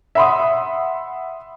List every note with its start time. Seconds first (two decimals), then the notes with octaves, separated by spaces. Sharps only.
0.15 E5 F#5 B5 C6 D#6